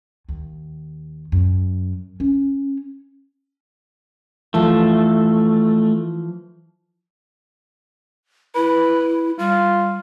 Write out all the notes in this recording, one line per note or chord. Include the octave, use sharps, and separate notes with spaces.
D#2
F#2
C#4
E3 F3 A3 A4
E4 B4
G3 F4